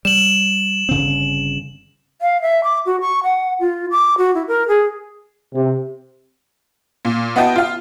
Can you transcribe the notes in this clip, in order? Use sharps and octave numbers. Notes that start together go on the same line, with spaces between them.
G3 E7 F#7
G1 C#3 C4
F5
E5
D6
F#4
C#6
F#5
F4
D6
F#4
E4
A#4
G#4
C3
A#2
B3 E4 F#4 D#5 G5 A5
F4 F5